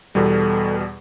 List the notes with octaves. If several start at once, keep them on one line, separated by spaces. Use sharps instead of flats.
E2 B2 G3 A4